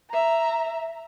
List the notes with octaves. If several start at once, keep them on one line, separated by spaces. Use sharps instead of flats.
E5 A#5